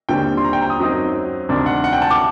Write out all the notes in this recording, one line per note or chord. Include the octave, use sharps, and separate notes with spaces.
D#2 D3 G3 C4 G5
C6
A#5
G5
A#5
D#6
F#2 F#3 C4 D#4
D2 C3 D#3 G3 D4
F#5
F#5
G5
A5
D6